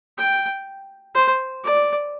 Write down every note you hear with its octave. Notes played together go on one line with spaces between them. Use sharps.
G5
C5
D5